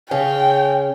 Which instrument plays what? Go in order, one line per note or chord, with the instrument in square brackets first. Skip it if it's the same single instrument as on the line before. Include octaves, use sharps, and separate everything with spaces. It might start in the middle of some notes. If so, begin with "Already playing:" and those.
[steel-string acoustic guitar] C#3 C#4 G#4 [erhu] G5